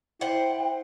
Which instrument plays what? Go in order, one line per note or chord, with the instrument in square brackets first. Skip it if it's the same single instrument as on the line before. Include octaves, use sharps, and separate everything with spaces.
[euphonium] E4 [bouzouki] C5 F#5 [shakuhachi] G5